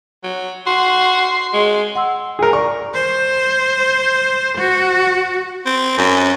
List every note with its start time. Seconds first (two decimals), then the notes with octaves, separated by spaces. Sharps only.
0.24 F#3
0.66 F#4 C6
1.53 G#3
1.95 F#5 C6 E6
2.39 G#4 A#4
2.53 D5 C#6
2.94 C5
4.58 F#4
5.66 C4
5.97 F#2